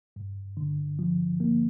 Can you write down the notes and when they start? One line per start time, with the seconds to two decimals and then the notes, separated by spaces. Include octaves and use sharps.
0.16 G2
0.57 D3
0.99 F3
1.40 A#3